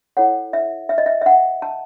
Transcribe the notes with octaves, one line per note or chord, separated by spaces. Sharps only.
E4 A4 C#5 F#5
E5
E5
D#5
E5
E5
F#5
A5